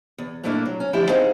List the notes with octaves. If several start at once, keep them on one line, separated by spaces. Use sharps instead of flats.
E2
G2 A#2 A3 A#3 D4 E4
F#3
C#4
D3 F3 A3 D4 E4 G4
C4 D#4 G#4 C5 F5 F#5